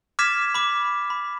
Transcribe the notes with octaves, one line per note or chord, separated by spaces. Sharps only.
D6 F6 G#6 A6 B6 E7
B5 D6
B5